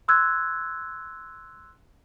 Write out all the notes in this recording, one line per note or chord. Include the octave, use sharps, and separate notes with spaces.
C6 E6 F#6 G#6